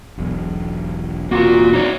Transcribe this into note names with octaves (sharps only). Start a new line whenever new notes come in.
E1 B1
E1 C3 A#3 F4 F#4
D#4 C#5 D5